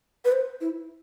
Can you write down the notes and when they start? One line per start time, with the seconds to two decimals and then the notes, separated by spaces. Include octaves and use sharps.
0.25 B4
0.32 C5
0.61 E4